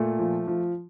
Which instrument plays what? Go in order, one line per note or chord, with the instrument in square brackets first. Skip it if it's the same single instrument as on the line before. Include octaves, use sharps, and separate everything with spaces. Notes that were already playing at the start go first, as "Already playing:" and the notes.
Already playing: [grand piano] A#2 A3
F3
F3